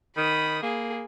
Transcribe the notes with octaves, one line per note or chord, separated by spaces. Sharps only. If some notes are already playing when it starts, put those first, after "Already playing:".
D#3 B5 D#6
A#3 G#4